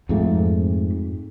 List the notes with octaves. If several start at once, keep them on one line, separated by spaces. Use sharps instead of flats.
F2 G#2 A3